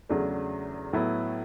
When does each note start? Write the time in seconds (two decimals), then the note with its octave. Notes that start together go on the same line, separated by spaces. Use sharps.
0.09 E2 C#3 F#3 A3 D4
0.93 A2 F#3 B3 E4